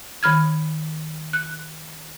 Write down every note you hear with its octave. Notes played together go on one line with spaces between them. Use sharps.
D#3 B5 F6 G#6
F#6